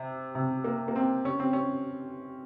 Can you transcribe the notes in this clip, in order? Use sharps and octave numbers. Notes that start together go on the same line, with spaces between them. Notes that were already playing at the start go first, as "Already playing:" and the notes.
Already playing: C3
C3
A#3
A#3
C4
C#4
C4
C#4